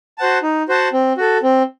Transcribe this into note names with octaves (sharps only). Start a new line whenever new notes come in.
F#4 C5 F#5 A5
D#4
F#4 C5 F#5 A5
C4
F#4 A4
C4